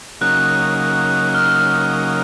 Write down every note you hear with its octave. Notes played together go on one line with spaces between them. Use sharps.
C#3 F#3 A#3 D#4 F#6
F6